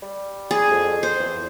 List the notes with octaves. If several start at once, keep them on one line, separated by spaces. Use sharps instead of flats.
G3
G#4
F2
C5
E2